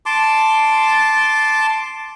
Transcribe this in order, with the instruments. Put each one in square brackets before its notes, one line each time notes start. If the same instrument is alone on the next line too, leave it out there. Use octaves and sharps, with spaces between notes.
[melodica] A5 C6 D6